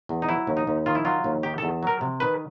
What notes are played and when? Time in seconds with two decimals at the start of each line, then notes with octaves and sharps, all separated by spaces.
0.09 E2
0.22 D#4
0.29 F#3 E4
0.47 D#2
0.57 D#4
0.67 D#2
0.86 D#3 F4
0.95 E4
1.05 F#3 F4
1.24 D#2
1.43 D#3 G4
1.58 E2 A4
1.83 F#3 A#4
2.01 C3
2.20 D#3 B4